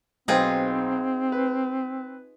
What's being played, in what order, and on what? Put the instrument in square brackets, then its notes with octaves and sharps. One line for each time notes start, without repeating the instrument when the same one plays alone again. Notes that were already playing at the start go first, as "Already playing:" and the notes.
[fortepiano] B1 C5 G5 [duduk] C4 [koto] D#4 F4 G#4
[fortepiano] B4